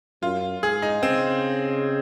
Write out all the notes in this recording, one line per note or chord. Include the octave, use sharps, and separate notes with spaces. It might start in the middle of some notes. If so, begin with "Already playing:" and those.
F#2 F4
G#2 G#4
D#4
C#3 C4